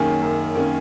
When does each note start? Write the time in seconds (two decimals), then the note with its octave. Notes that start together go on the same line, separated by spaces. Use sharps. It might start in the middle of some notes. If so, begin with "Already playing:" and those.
Already playing: F#2 D#3 A#3 C#4 G#4
0.22 F#2
0.55 D#3 A#3 C#4